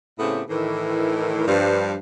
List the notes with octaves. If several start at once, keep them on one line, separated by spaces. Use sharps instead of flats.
A2 C#3 A3 B3 C4 G4
A2 D#3 E3
G2 F3